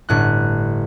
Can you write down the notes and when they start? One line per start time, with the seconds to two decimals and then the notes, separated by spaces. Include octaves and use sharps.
0.09 G1 A2 F#6